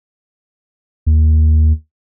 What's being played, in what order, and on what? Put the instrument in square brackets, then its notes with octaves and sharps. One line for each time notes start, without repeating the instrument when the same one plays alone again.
[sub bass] D#2